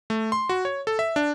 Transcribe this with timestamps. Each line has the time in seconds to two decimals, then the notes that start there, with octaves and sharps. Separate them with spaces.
0.10 A3
0.32 C6
0.49 F#4
0.65 C#5
0.87 A4
0.99 E5
1.16 D4